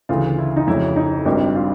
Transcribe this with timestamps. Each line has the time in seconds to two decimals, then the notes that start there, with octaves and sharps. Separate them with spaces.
0.09 D2 C#3 E3 F4
0.38 E4
0.56 D#4
0.67 F2 C#3 F#3 E4
0.96 D#4
1.25 G#1 G2 D#3 G3
1.55 F4